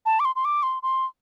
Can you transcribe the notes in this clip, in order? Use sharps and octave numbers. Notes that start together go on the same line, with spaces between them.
A5
D6
C6
C6
D6
C6
C6